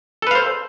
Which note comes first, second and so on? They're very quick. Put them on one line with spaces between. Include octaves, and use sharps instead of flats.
A4 B4 F5 C5